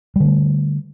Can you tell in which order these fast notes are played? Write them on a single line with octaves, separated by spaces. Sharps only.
G3 D3 A3